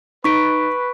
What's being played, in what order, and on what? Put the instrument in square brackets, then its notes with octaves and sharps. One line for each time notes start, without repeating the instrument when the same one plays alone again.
[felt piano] D#4 [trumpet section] B4 [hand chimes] C#6 B6 D7